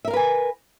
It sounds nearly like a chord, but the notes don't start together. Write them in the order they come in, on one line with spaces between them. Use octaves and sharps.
E5 A#4 F5 B4 G#5